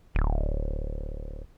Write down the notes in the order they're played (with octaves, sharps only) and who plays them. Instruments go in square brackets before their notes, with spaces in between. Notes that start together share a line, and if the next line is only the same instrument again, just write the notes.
[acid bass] D1